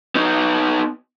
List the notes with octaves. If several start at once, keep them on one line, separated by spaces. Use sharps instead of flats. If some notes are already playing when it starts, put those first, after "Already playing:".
B3 D#4